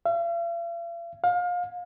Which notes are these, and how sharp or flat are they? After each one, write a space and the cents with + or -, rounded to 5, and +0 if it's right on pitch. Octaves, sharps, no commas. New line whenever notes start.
F5 -45
F5 +30